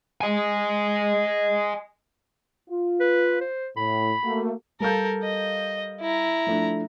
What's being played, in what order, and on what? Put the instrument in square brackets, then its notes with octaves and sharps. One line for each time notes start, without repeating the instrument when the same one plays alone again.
[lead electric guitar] D#5 G#5
[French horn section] F4
[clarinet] B4
C5
[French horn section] A2 [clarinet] B5
[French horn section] A3 A#3 F#4
[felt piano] G3 F5 G6 [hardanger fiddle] A4 A#4
[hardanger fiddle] D#5
E4 A#5
[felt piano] F3 A3 D4